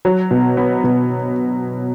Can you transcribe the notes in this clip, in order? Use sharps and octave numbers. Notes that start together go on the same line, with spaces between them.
F#3
B2
B3
B2